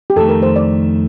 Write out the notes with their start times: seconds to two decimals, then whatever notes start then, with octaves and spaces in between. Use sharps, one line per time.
0.10 G4
0.16 F2 D#3 A3 A4
0.29 A#4
0.42 C5
0.56 D5